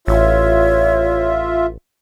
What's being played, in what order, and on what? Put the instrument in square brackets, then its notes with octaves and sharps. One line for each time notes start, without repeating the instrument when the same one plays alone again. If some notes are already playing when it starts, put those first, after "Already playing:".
[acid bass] A1 [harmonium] F4 E5 [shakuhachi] C#5